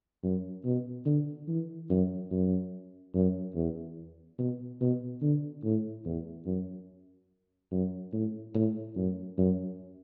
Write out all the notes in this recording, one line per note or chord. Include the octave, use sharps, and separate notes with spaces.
F#2
B2
D3
E3
F#2
F#2
F#2
E2
B2
B2
D3
A2
E2
F#2
F#2
A2
A2
F#2
F#2